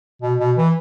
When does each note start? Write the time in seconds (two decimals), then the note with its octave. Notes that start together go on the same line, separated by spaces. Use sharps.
0.22 B2
0.40 B2
0.57 E3